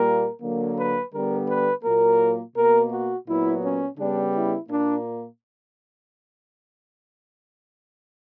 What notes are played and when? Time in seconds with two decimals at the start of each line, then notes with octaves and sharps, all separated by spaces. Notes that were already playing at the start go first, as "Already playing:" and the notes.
Already playing: A#2 G3 A#3 A#4
0.42 D3 F#3 A#3
0.77 B4
1.13 D3 G3 B3 A#4
1.48 B4
1.84 A#2 F#3 A#3 A#4
2.55 B2 A#3 A#4
2.91 F#4
3.27 A#2 F#3 B3 E4
3.63 C#4
3.97 C#3 G3 B3 D4
4.34 E4
4.69 A#2 A#3 D4